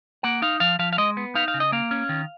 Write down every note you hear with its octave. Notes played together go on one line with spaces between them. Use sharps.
A#3 F#5
D#4 F5
F3 F5
F3 F5
F5
G#3 D#5
B3
D#4 F5
F5
C#3
D#5
A#3 F5
C#4
D#3